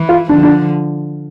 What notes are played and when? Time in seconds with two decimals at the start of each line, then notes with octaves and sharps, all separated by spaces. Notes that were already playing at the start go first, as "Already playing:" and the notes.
Already playing: E3
0.09 F4
0.29 D3 F3 D4
0.43 D4